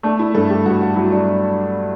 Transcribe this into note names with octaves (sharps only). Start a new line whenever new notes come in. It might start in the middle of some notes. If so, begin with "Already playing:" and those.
A3 D4
E4
G2 A4
G4
G2 F#4
F#4
F#3 E4
D4